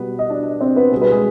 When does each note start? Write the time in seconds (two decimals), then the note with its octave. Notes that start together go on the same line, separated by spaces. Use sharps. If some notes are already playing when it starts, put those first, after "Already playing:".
Already playing: B2 G3 B3 B4
0.19 D#5
0.30 D4 D5
0.61 C4 C5
0.76 B3 B4
0.92 B2 G3 G#4
1.02 B4
1.11 G#3 G#4